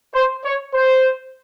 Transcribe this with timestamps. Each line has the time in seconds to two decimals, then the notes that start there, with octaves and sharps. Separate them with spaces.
0.15 C5
0.45 C#5
0.74 C5